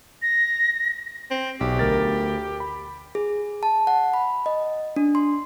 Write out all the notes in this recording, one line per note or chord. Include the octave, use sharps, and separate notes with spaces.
A#6
C4
B1 G4
D2 A#4 A6
B5
G#4
A5
F#5
B5
D#5
D4
C6